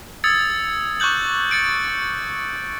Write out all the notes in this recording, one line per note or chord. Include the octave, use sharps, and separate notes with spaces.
D#6 E6 G#6 A6 C#7
C#6 D6 F#6 G6 F#7
A6 C#7 D7